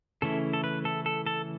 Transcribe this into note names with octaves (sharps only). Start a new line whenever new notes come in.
C#3 E3 A3 C#4 E4 A4
A4
B4
A4
A4
A4